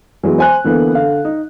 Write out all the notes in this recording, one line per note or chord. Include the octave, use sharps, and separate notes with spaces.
E3 F#3 G#3 B3
C5 G#5 F#6
D3 E3 A#3 B3
D3 F5
D#4